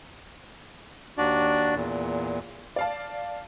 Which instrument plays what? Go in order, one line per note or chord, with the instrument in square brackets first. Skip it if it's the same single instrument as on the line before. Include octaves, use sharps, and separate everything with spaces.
[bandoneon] D#2 D4 F#4 D5
E2 A#2
[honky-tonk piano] D5 F5 A5